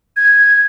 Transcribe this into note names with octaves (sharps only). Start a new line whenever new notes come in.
G#6